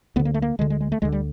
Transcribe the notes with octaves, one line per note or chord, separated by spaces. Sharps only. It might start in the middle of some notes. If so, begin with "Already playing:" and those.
D2 D3 B3
A#3
A3
A#3
D2 D3 G#3
G#3
G#3
A3
D2 D3 G#3
G3